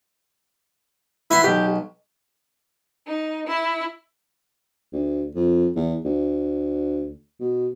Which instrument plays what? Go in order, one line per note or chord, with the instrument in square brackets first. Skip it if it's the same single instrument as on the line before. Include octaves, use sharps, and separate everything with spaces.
[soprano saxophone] E4 [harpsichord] B4 F#5 C6
[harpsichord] B1 [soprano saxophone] G4
[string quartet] D#4
E4
[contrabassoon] D2
F2
E2
D2
B2